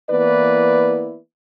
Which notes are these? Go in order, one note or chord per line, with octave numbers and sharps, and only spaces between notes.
E3 A#3 B3 E4 B4 D5